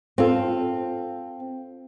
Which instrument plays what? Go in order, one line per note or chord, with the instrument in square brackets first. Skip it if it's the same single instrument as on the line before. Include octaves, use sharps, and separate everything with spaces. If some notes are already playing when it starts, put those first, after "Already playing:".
[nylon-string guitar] C4 F4 A4